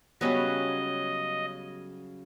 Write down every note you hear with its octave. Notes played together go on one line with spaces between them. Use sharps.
C#3 F#3 G3 B3 C#4 D#5